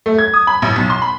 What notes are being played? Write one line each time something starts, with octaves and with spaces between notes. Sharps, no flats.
A3
G#6
D#6
B5
A1
B1
C6
B5